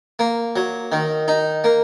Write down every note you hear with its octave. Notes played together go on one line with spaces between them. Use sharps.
A#3
F#3
D#3
D#4
A#3